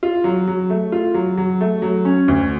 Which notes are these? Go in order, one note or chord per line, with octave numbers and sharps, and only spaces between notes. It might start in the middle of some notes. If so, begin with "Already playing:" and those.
F4
F#3
F#3
A3
F4
F#3
F#3
A3
F#3
C#4
D2